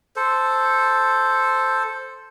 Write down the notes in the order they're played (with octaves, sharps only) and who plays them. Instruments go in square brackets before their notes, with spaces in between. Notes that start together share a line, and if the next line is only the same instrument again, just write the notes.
[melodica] A4 C5